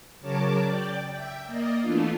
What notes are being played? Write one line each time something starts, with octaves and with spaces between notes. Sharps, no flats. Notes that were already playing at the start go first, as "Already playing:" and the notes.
C#3 F#3 A#4 C#5 A5 D6
D5 G5
E5 G5
A#3 D5 D#5
E3 A3 B3 D4 F4